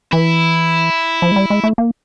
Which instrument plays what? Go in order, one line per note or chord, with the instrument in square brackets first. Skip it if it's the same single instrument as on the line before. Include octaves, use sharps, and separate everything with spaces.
[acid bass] E3 [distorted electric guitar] E4
[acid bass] F3
G#3
G3
G#3
A3
A#3